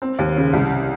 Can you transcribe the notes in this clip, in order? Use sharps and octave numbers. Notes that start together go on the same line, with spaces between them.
C4
D#2
C#3
C2